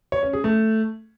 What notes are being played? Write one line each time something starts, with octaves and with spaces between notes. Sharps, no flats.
C#5
C#4
G#4
A3